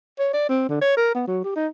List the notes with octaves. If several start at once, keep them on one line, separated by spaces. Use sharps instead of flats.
C#5
D5
C4
D3
C#5
A#4
B3
F#3
G4
D#4